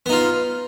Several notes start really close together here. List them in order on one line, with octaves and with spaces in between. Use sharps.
B3 D#4 F4